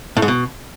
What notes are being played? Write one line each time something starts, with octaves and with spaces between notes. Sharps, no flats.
A2
G#2
B2